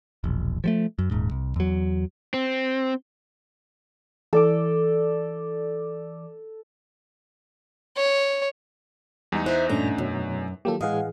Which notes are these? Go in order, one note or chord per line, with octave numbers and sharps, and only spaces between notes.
E1 A#1
F3 F#3 A3
F#2
D#1 G#2
C2
E2 F#3
C4
E3 A4 D5 D6
C#5
E2 G3 G#3 D#4
E4 C5 E5 F#6
G2 A#2 A3 C#4 D4 A#5
F#2 B2 F#3
D#3 F#3 A#3 F4 G4 A4
A2 E3 G#3 G#4 D#5 F5 F#5